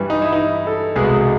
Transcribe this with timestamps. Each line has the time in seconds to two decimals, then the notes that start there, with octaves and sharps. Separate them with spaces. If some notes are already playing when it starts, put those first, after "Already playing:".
Already playing: G2 E3 G3
0.10 D#4
0.22 E4
0.33 D#4
0.67 A4
0.96 C2 B2 G#3 G#4